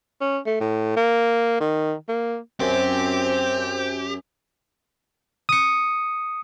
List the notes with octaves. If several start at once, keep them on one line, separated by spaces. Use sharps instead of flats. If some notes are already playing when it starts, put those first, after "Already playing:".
C#4
A3
A2
A#3
D#3
A#3
F#2 C4 G4 C5
D#6 C#7